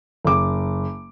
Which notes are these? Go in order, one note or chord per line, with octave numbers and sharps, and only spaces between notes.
F#1 D6